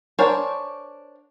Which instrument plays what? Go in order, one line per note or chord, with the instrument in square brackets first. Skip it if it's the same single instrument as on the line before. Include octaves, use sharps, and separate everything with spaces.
[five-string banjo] D4 A#4 C5 C#5 G#5